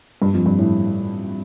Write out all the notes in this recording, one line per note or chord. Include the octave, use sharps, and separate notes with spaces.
G2
F2
G2
A2